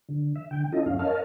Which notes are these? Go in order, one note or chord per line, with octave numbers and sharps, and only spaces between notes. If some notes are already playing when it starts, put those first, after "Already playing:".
D3
E5
D3 G5
C#4 E4 F4 A4 D#5
F#2 C#4 F5
A#4 C#5 D#5 F5 A5 F6